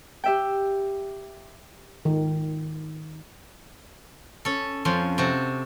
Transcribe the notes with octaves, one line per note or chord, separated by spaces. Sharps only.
G4 E5 G5
D#3
C#4 A4
F2 F3 C#4 C6
C3 F#4 A4